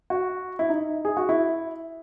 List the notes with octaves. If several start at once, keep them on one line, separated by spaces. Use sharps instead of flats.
F#4
E4
D#4
G#4
F#4
E4